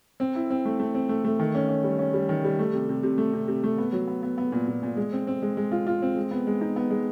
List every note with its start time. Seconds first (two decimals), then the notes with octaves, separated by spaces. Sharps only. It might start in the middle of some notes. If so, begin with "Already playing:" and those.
0.20 C4
0.35 E4
0.50 C4
0.65 A3
0.80 A3
0.95 C4
1.09 A3
1.24 A3
1.39 D#3
1.55 C#4
1.69 C#4
1.84 G3
1.99 C#4
2.13 G3
2.29 D#3
2.44 G3
2.59 A3
2.73 C3
2.89 C3
3.03 C3
3.18 A3
3.33 C3
3.48 C3
3.64 A3
3.78 B3
3.93 F#3
4.07 B3
4.23 B3
4.38 B3
4.52 A#2
4.68 A#2
4.83 A#2
4.97 G#3
5.13 C4
5.27 C4
5.42 G#3
5.57 G#3
5.71 F4
5.87 F4
6.02 C4
6.16 G#3
6.31 B3
6.47 G#3
6.61 D#4
6.76 B3
6.90 G#3